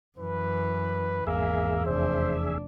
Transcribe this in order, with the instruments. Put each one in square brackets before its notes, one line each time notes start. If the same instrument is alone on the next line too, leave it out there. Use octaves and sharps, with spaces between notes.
[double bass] F#2 E3 [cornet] B4
[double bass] G#1 [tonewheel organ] E2 G#4 E5 [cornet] A#3
[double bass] F1 D4 [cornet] C5